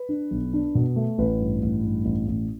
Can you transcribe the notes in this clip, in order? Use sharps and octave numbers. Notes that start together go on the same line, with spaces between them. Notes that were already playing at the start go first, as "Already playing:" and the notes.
Already playing: B4
D4
B1
D4
B2
A3
A1 B4
G2
A1
G2
A1
A1